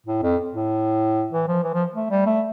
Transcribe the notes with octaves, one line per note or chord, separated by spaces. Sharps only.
A2
F2
A2
E3
F3
E3
F3
A3
G3
A3